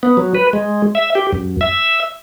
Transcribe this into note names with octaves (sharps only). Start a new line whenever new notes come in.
B3
F#3
B4
G#3
E5
G4
F#2
E5